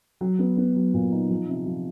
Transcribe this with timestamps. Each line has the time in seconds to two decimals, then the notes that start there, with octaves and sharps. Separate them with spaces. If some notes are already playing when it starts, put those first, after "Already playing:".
0.21 F#3
0.39 B3
0.57 B3
0.76 F#3
0.94 A#2
1.12 D#4
1.30 F3
1.49 C3
1.67 F3